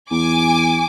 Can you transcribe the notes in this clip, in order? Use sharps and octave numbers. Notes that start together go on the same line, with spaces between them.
E2 G#5 D6